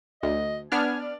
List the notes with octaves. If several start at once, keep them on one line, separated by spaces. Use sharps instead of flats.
D2 D#5
B3 D4 G#5 F6
D5